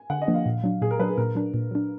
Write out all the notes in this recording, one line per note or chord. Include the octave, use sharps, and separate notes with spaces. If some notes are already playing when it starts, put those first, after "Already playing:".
Already playing: G#5
D3 F#5
D#5
F3 A#3 D4
F5
A#2
F#3 D4
A#2 G#4
A#4
F#3 D4 B4
G#4
A#2 A#4
F#3 D4
A#2
F#3 D4